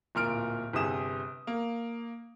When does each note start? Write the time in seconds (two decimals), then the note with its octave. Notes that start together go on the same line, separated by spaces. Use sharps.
0.15 D1 A#2 A#4 F6 D7
0.73 G1 C3 G4 G#4 D#6 E7
1.47 A#3